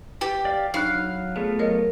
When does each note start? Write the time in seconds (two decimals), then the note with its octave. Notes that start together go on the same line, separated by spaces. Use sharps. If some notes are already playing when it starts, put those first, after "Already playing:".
0.21 G4 B4
0.45 D5 F5
0.74 F#3 D4 D#4 F5 B5 F#6
1.36 A3 B3 F4 G#4
1.59 F#3 A#4 C#5 D#5